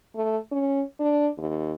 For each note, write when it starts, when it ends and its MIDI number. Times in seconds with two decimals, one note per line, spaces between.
0.16 0.38 57
0.51 0.82 61
0.99 1.28 62
1.38 1.74 39